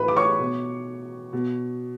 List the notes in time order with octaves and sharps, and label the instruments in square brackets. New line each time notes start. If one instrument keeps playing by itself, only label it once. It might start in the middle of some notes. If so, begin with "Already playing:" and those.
Already playing: [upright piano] A2 E3 B4 B5
D6
C#5 C#6
B2
B2